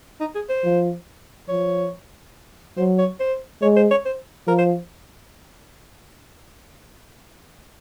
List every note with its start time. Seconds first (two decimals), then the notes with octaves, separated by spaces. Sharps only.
0.20 D#4
0.35 G#4
0.49 C5
0.64 F3
1.49 F3 C#5
2.77 F#3 C5
2.98 C#5
3.20 C5
3.62 G#3 C#5
3.76 C5
3.91 C#5
4.05 C5
4.47 F3 A#4
4.58 C5